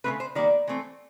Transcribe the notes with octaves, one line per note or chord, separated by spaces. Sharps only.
C#3 F3 A3 C4 B4
C5
D#3 G3 A#3 D5
E3 A3 C4